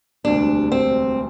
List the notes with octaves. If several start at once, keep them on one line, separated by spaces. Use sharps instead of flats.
E1 D2 C3 G3 D4
C4